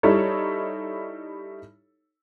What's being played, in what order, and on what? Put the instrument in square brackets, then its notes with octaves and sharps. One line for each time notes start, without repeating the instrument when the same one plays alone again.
[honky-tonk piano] G3 D#4 E4 A4 C#5